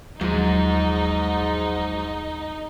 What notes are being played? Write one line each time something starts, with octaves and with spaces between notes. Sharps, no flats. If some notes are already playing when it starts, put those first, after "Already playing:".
D#2 G#2 F3 F#3 G#3 D#4